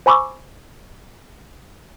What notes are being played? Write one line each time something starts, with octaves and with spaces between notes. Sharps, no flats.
C5 G#5 B5 C#6 D6 E6